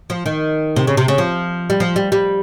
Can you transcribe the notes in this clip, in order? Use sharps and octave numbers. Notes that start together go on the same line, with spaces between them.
F3
D#3
C3
C#3
C3
C#3
F3
G3
F3
G3
G3